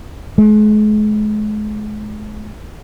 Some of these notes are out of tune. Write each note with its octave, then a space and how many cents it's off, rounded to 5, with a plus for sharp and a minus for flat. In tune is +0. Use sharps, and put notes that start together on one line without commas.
G#3 +40